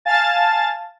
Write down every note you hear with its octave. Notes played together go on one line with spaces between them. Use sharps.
F5 G#5 A5 A6